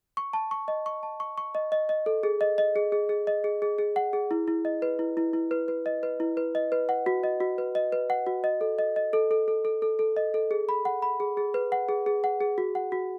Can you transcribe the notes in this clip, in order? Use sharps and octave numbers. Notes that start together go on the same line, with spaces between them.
C#6
A5
C#6
D#5
C#6
A5
C#6
C#6
D#5
D#5
D#5
A4
G#4
D#5
D#5
G#4
G#4
G#4
D#5
G#4
G#4
G#4
F#5
G#4
E4
E4
D#5
B4
E4
E4
E4
B4
B4
D#5
B4
E4
B4
D#5
B4
F#5
F#4
D#5
F#4
B4
D#5
B4
F#5
F#4
D#5
A4
D#5
D#5
A4
A4
A4
A4
A4
A4
D#5
A4
G#4
B5
F#5
B5
G#4
G#4
B4
F#5
G#4
G#4
F#5
G#4
F#4
F#5
F#4